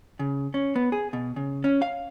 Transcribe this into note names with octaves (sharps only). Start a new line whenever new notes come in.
C#3
C#4
B3
G#4
B2
C#3
C#4
F5